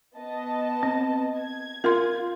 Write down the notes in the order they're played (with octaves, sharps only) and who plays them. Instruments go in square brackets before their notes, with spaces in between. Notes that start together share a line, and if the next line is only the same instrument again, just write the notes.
[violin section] B3 D#5 A5
[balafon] C4
[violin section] G#6
[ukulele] F4 [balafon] A#4 C6